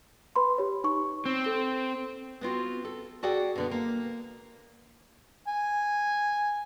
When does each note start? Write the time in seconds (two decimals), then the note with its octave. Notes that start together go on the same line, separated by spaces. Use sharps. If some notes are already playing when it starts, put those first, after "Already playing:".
0.36 B4 B5 C6
0.58 G4 C#5
0.84 D#4 C#6
1.26 C4
1.44 A4 G7
2.41 B3 C4 F4 F#4
2.85 A4
3.23 F#4 G#4 A4 D5 F#5 G5
3.55 B2 D3 B3
3.71 A#3
5.48 G#5